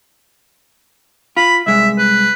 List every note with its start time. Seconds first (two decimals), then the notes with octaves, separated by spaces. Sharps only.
1.37 F4 B5
1.67 C2 G#3 E5
1.98 B4